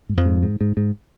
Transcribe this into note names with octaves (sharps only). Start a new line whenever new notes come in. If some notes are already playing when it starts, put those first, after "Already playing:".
G#2
F2 F3
G#2
G#2
G#2
G#2